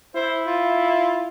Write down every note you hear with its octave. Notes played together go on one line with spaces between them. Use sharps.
E4 C5
F4